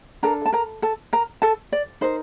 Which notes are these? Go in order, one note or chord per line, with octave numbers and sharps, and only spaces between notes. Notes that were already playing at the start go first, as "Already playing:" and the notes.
D4 A4 A#4 A#5
A5
A#4 A#5
A4 A5
A#4 A#5
A4 A5
D5
D#4 A#4 C5